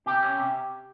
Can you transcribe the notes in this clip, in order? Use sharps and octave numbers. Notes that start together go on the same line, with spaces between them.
C3 G4
C#4
C3